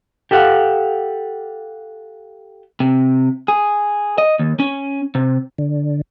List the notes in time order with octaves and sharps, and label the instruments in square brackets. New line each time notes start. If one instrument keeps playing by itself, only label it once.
[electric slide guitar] G4 A4 F5 F#5
[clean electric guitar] C3
G#4
D#5
D#2
C#4
C3
[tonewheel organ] D3